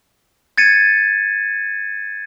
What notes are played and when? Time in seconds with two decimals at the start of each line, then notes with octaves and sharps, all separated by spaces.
0.58 G#6 A6 C#7 D#7